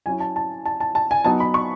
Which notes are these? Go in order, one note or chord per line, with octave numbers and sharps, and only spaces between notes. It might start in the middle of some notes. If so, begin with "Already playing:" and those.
F#3 C#4 E4 G#5
A5
A5
A5
A5
A5
G#5
F#3 B3 D#4 A5
B5
C#6